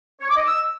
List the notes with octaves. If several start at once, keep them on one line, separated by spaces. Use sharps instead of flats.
C#5
D6
D#5
E6